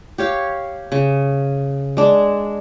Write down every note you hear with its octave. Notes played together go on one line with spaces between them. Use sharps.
G4 C#5 F5
C#3
G#3 D4